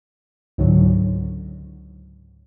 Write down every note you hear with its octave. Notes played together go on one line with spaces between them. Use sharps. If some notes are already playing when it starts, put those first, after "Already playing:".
C#2 G#2 D3 F#3